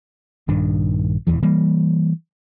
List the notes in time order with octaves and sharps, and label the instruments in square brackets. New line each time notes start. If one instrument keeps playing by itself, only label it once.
[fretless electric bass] A#1 G2 D#3 D4
D#1 B1 E2 E3
E3 G3 A#3